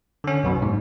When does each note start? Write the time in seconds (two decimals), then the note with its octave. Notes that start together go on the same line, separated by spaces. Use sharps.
0.24 D3 C#4
0.44 B1 F#2 B2
0.62 G#2